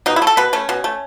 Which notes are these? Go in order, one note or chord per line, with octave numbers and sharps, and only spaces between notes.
B2 D#4
E4
A3
A4
B2 B4
A3 C#4
B2
A3